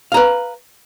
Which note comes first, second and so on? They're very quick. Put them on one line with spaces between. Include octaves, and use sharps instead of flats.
F5 A#5 B4